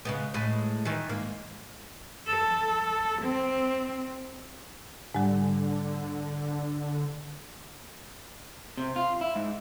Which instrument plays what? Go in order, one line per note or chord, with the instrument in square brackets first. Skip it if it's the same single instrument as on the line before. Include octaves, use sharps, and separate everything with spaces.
[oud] C#3 G#3 B3
A2 G#3 B4
D#3 E3
G#2 A#3
[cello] A4
C4
[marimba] G#2 G3 [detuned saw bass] D3
[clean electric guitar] C3
F4
E4
G#2